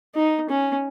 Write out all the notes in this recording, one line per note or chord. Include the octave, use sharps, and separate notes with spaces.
D#4
C#4